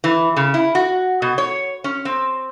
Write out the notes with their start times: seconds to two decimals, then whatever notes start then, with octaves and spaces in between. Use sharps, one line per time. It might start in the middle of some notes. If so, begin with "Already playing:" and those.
0.04 E3
0.37 C#3
0.54 E4
0.75 F#4
1.22 B2
1.38 C#5
1.84 C#4
2.05 C4